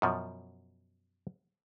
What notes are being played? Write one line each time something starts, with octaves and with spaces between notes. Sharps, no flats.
F#2 B2 F3